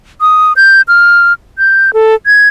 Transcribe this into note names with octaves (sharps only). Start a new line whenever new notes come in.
D#6
G6
F6
G6
A4
G#6